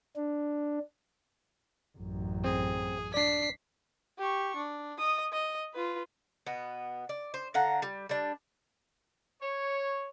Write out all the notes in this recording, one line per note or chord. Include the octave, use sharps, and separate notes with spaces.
D4
A1 F#2
C4 G#4
D4 D5 B6 C7
G4 C#6
D4
D#5 D#6
D#5
F4 B4
B2 B3
D5
C5
D3 F5 F#5 A#5
G3
G3 D4
C#5